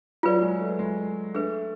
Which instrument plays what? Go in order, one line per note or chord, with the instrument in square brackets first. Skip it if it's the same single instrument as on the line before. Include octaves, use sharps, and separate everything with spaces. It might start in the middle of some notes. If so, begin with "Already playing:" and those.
[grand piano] F#3 [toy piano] F4 G#4 B4 D5
[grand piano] G#3
A3
G#3
[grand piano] A3 [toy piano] D4 G#4 B4